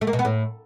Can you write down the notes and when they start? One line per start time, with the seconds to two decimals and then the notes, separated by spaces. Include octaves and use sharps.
0.01 A3
0.07 A#3
0.13 B2
0.19 B3
0.25 A2